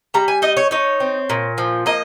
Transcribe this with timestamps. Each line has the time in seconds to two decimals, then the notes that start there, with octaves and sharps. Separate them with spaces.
0.14 G3 A#5
0.28 G#5
0.42 D#4 D#5
0.57 C#5
0.71 D#4 C#5
1.00 C4
1.30 A#2
1.58 F3
1.86 A#3 D#5